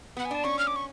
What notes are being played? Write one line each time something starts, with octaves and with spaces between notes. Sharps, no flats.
B3 F#5
G#5
D4 A5
C#4 C#6
F6
D6
C#6